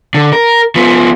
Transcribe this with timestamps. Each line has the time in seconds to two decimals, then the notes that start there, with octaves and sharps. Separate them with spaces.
0.15 D3
0.32 A#4
0.76 F3 B3